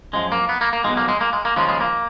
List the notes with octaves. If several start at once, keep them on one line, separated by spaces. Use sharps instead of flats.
F#2 F3 G#3
A#3
B3
A#3
A#3
B1 B2 G#3
A#3
G#3
A#3
G#3
A#3
D#2 C#3 F3 G#3
G#3
A#3